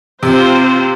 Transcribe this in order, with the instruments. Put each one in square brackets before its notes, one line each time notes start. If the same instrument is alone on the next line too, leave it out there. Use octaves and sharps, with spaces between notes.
[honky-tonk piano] C3 [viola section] C4 F4 C5